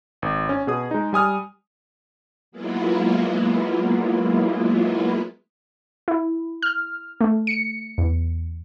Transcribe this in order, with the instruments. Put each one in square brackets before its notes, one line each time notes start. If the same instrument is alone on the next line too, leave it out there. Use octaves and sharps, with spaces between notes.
[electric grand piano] G#1
C#4
B2 G#4 D#6
G#3 D#4
G3 G#5 D#6 F6
[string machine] F#3 G#3 A#3 B3 E4 F4
[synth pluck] E4
F6
A3
C#7
E2